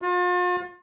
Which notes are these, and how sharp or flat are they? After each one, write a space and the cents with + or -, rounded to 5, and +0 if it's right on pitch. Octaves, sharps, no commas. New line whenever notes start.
F4 +40